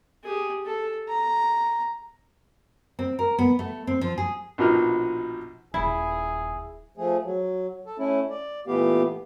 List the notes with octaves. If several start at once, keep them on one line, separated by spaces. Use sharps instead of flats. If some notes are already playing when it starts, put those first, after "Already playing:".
G4 G#4
A4
A#5
C4
A#4
B3
A3
C4
F3
G#4
A#1 B2 F3 D#4 F6
D#1 E4 G#4
F3 A3 G#4
F#3
A4
A3 C#4 E4
D5
A#2 E3 A3 B3 G4 F5